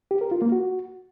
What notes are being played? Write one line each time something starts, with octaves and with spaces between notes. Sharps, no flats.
G4
A#4
F4
A#3
F#4